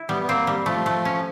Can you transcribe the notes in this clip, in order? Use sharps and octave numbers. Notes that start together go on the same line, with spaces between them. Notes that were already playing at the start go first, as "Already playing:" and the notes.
Already playing: E4
G3 B3
B3
A#3 C4
G3
F3 A3
A3
C#4